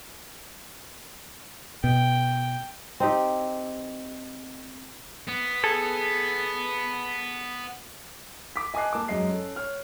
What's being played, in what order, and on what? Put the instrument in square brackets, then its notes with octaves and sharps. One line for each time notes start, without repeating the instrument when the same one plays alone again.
[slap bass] B2 [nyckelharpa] G5
[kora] C4 D#4 G4
[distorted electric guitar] B3
[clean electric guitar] G#4 A4
[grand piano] D6 B6
D#5 G#5 A5 D6 F#6 C7
A#3 A5 D6
F#2 G#3 D#5 C7
C#4 A4
C#5 F6